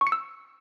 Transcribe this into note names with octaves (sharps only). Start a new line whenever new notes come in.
C#6
C#7
E6